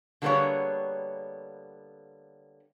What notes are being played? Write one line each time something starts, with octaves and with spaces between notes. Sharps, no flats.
D3 G3 A#3 B3 G#4 C#5